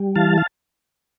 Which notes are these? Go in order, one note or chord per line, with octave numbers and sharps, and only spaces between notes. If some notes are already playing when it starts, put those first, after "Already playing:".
Already playing: G3
E3 F5 A5
F5